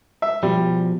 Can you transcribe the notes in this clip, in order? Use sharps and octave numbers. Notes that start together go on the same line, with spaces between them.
E5
B2 F3 G3